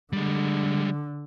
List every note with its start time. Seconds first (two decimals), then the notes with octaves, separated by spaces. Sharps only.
0.13 D3 G3 G#3